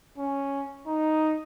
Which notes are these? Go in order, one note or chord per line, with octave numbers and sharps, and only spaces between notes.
C#4
D#4